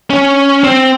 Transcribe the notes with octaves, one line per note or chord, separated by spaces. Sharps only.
C#4
C4